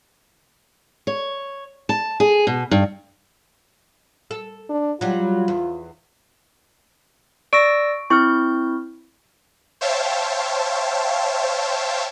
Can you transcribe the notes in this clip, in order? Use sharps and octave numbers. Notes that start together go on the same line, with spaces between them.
C#5
A5
G#4
B2
G2
A4
D4
F#3 G3 F4
E2
D5 C#6 E6 A#6 D7
C4 E4 C#6 F6 G6
C5 C#5 E5 F5 G5 A5